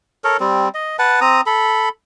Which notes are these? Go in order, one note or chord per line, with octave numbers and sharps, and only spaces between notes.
A4 A#4 C#5
G3 C4
D#5
B4 F#5 A5
C4 A#5 D#6
A4 B5